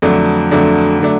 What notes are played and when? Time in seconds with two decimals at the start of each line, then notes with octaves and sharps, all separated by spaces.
0.02 F2 D3 F#3 A3 D4
0.51 F2 D3 F#3 A3 D4
1.00 D3 F#3 A3 D4